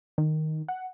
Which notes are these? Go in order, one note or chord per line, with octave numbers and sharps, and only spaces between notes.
D#3
F#5